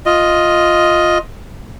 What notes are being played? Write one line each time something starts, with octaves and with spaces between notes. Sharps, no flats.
F4 D#5